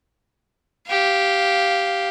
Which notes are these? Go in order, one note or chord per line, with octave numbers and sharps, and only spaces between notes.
G4 F5